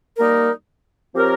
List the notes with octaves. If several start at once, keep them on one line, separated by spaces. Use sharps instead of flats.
G3 A#3 D#4 A#4
F3 C4 G4 A#4 C#5